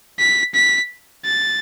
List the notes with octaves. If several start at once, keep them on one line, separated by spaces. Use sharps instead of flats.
B6
B6
A6